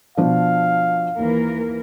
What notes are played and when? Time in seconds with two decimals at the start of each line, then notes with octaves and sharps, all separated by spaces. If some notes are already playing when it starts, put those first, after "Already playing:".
0.17 B2 F3 D4 F5
1.19 D#2 E3 A#3 A#4